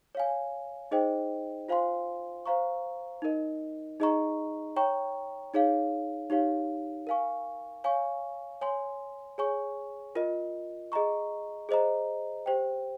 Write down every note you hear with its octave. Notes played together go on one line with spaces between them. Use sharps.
C#5 F5 G#5
D#4 G#4 C5 D#5 G5
F4 C5 F5 G#5 C6
C5 F5 A#5 C#6
D#4 A#4 D#5
D#4 G#4 D#5 A#5 C#6
C#5 G5 A#5 C#6
D#4 G#4 C#5 F5
D#4 G4 C#5 F5
A#4 F5 G#5 C#6
C#5 F5 G#5 C#6
C#5 G#5 C6
G#4 C#5 G#5 C#6
F4 A#4 D#5
G#4 D#5 A#5 C#6
G#4 C5 D#5 A#5
G4 C5 G5